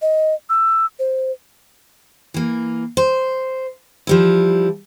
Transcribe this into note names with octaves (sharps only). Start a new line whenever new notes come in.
D#5
E6
C5
E3 A#3
C5
F3 G3 E4